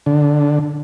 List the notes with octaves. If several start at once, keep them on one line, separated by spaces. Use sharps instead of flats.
D3